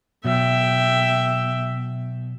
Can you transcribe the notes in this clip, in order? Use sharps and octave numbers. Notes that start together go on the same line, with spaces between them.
B2 F#3 E5 G5